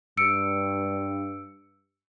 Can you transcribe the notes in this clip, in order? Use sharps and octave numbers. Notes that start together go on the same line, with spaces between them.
G2 E6 C#7 D7